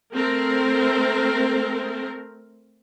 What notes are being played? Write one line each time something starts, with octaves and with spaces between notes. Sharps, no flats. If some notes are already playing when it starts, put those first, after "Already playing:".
A3 C4 A#4